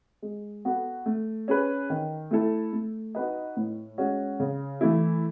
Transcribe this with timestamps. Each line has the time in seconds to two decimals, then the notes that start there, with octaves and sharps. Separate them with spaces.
0.22 G#3
0.65 B3 F#4 A4
1.06 A3
1.48 C#4 G#4 B4
1.90 D#3
2.31 A3 E4 A4
2.73 A3
3.15 D#4 F#4 B4 D#5
3.57 A2
3.98 G#3 C#4 F#4
4.40 C#3
4.81 E3 A3 E4